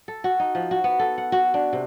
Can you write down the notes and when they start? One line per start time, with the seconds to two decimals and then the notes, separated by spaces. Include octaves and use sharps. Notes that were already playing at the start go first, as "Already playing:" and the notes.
0.08 A4
0.24 F#4
0.40 D#4
0.55 F3
0.71 F#4
0.84 B3
0.99 A4
1.18 F#5
1.32 F#4
1.54 D4
1.73 C3